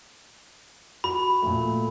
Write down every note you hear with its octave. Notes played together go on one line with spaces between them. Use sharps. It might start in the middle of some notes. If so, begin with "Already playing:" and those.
F#4 B5
A#2 A3